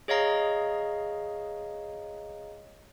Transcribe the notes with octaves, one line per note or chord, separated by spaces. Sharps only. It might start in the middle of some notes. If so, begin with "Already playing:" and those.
G#4 C#5 D#5 F5 A#5